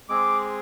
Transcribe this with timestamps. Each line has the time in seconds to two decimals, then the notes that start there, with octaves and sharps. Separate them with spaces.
0.09 G#3 C4 G#4 D6